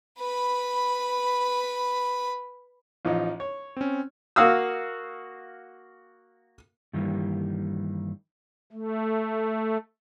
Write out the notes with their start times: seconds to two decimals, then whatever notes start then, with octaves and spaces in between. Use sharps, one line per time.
0.19 B4 B5
3.05 A1 F3 D#4
3.40 C#5
3.77 C4 C#4
4.36 A#3 F#4 F5 D#6 E6
6.93 G2 D#3 E3 G3 A#3
8.73 A3